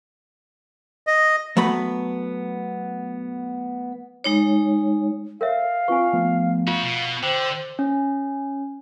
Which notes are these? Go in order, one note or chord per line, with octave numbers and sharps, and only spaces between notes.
D#5
F#3 A3 B3 B5
G#3 D#4 C#5
A#4 C#5 E5 F5
C4 F4 B4 G#5 C#6
F3 A3 B3
C#4 F4 F#4 F5
B2
D3 C5 G5
C#4